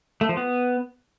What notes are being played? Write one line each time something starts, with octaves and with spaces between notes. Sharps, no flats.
A3
F3
B3